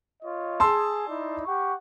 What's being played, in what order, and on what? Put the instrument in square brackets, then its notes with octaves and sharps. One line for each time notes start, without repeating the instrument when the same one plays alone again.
[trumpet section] F4 C#5 D#5
[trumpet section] G#4 [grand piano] A5 C6 E6
[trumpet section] D#4 E4 D5
G4 F#5 C#6